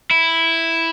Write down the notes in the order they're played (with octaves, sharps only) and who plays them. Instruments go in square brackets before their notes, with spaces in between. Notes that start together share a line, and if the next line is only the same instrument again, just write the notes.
[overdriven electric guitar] E4